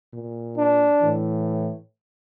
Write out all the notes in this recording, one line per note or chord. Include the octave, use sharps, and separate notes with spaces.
A#2
D4
A2 E3